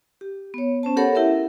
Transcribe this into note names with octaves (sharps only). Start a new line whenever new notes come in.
G4
B3 C#5
B3 C#4 C5 A5
G4 A4 A#4 C#5 F#5 B5
E4 G4 A#4 E5